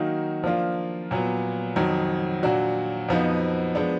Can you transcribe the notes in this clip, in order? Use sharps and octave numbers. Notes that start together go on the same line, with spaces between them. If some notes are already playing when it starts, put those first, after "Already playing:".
Already playing: D#3 F#3 A#3 D#4 F#4
F3 A#3 D4 F4
A#2 F#3 B3
F2 D#3 F#3
A#2 F#3 D4 F#4
F2 F3 B3 D#4 F#4
F3 G#3 B3 D4